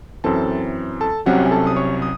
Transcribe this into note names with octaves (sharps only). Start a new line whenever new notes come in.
F#2 E3 C4 A4 A5
A4 A5
C2 C3 F#3 C#4 F#4 F#5
G#5
A4 A5
D#6
C#5 C#6
D#6